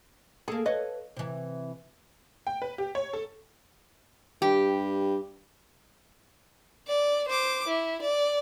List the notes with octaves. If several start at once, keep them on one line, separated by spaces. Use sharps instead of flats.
A#3 G#4 A4
B4 C#5 D#5
C3 E3
G5
B4
G4
C#5
A4
G2 G4
D5
C5 D6
E4
D5